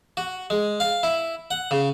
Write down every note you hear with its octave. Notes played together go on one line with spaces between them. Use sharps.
F#4
G#3
F5
E4
F#5
C#3